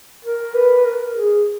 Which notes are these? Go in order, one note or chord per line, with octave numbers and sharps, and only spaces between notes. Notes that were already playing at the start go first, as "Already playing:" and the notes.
A#4
B4
A#4
G#4